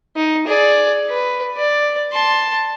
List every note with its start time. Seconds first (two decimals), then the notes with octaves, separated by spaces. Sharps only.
0.16 D#4
0.47 G#4 D5
1.10 B4
1.57 D5
2.13 A5 C6